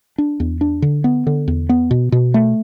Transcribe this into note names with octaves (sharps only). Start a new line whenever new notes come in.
D4
E2
D4
D3
B3
D3
E2
B3
B2
B2
A3